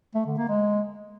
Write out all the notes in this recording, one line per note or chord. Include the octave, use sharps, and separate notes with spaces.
A3
D3
A#3
G#3